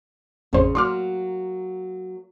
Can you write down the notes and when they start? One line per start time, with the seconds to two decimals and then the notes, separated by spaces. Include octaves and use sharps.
0.53 A1 F2 C#3 C5
0.75 F#3 A#3 C6 D6 F6